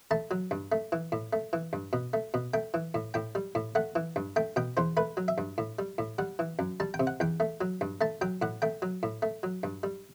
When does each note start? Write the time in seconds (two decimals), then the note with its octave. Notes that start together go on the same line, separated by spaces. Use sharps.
0.11 A3 A5
0.31 F#3
0.51 G2
0.72 A3
0.92 E3
1.12 A2
1.33 A3
1.53 E3
1.73 G2
1.93 B2
2.13 A3
2.34 B2
2.54 A3 G5
2.74 E3
2.94 A2
3.14 A2 G5
3.35 G3
3.55 A2
3.75 A3 F#5
3.95 E3
4.16 G2
4.36 A3 G5
4.56 B2 G5
4.77 E2 C5
4.97 A3 B4
5.17 F#3
5.28 E5
5.38 G2
5.58 A2
5.79 G3
5.98 A2
6.18 G3 F#5
6.39 E3
6.59 F#2
6.80 G3 A5
6.94 G5
7.00 C3
7.07 F#5
7.20 E2 G5
7.40 A3
7.61 F#3
7.81 G2
8.01 A3 A5
8.21 F#3 G5
8.42 A2 F#5
8.62 A3 G5
8.82 F#3
9.03 A2
9.22 A3
9.43 F#3
9.63 G2
9.83 G3